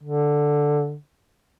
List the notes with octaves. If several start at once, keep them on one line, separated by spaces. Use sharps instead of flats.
D3